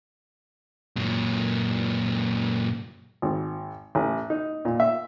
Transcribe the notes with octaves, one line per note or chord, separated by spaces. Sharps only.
F#2 A#2
G#1
A1
D#4
A#2
E5